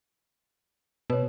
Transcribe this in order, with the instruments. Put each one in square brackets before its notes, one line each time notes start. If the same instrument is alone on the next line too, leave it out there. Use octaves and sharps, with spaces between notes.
[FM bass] B2 [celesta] B4 C#5